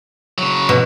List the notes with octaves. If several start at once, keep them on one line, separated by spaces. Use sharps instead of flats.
C#3 F#3
B2